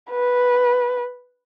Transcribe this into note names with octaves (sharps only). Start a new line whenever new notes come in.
B4